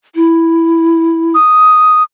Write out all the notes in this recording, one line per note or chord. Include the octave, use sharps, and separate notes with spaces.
E4
D#6